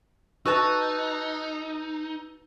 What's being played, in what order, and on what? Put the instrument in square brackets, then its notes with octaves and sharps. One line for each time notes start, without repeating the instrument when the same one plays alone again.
[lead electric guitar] D#4 [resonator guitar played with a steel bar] F#4 B4 A5 [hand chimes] E6 A6